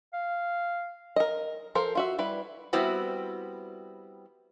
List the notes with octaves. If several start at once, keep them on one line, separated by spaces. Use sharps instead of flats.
F5
A#4 D#5
F3 A4 A#4 C5
F4 F#4 E5
G3 E4 B4
G3 B3 C4 E4 F#4